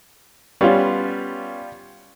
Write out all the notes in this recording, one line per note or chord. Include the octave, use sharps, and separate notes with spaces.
G3 B3 C#4 F4